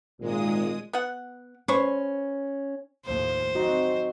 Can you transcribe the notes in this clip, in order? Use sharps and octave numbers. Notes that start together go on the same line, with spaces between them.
G#1 A#2 G#3 D#6
B3 F#5
C#4 B4 C5 C#6
D#2 A2 F3 C5
F#3 C4 D#4 F#4